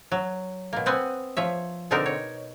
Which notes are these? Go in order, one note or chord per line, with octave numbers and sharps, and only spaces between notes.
F#3
B2 A#3
B3 C4 F#5 G#5
F3 C#5 E5
B2 D3 C4 D4 D#4 A#4
C#5